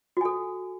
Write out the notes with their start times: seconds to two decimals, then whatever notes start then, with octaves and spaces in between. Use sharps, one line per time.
0.17 F#4
0.21 G#5
0.25 A4